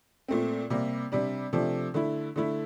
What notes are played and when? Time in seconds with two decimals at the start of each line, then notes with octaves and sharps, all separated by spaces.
0.28 A#2 A3 C4
0.70 C3 G3 A#3
1.12 C3 G3 D4
1.53 C3 F3 A3 D4
1.94 D3 A3 E4
2.36 D3 A3 E4